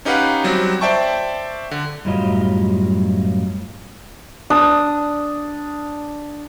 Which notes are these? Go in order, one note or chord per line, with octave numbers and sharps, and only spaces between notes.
C#4 D#4 G4 B4 F5 F#5
F#3 G3 C4
C5 D5 E5 G5 A5 C#6
D3
F#2 A2 F#3 G3 F4 D#5
D4 D#6